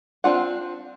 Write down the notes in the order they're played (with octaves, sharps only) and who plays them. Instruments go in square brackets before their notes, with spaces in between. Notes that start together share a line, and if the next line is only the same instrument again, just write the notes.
[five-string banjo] C4 D4 F4 F#5